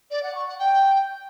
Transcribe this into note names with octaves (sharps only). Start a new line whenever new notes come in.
D5
F#5
C#6
F#5
G5